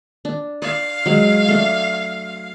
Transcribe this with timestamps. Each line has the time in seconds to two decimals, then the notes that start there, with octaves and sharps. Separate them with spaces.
0.25 D4
0.62 D5 F5
1.06 F#3 G#3
1.48 A3 D4